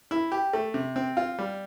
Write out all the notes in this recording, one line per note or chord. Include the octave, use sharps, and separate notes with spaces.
E4
G4
A3
C3
C4
F4
G3